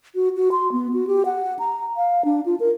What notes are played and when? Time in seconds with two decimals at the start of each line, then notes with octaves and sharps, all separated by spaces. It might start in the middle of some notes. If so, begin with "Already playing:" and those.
0.15 F#4
0.36 F#4
0.52 C6
0.72 B3
0.93 F#4
1.07 G4
1.25 F#5
1.59 A#5
1.97 F5
2.25 D4
2.46 F4
2.60 A#4